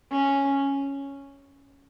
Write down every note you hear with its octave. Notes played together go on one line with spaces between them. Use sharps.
C#4